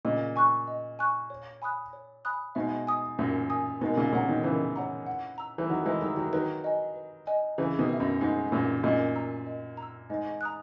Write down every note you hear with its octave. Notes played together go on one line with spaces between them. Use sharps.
A#2 C#3 D#5
G#5 C#6 F#6
D#5
G#5 C#6 F#6
C#5
G#5 B5 D#6 F#6
C#5
G#5 B5 D#6 F#6
G#2 B2 E5
G#5 D#6
F#2 A#2 E5
G#5 D#6
G#2 B2 A#4
A#2 C#3
A#2 C#3 C#5 F#5 A#5
B2 D#3
C#3 E3 A#4
C#5 F#5 A#5
F#5
A#5 E6
E3
D#3 F#3 F#5
E3 G#3
D#3 F#3 A#5 E6
D#3 F#3
D#3 F#3 B4
D#5 G#5
B4
D#5 G#5
C#3 E3 G#4
B2 D#3
B4 E5
F#2
G#2 G#4
F#2 A#2 B4 E5
F#2 A#2 D#5
A#5 E6
D#5
A#5
E6
G#2 D#5
A#5 D#6 F#6